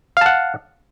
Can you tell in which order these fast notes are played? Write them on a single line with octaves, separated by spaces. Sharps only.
F5 A5 F#5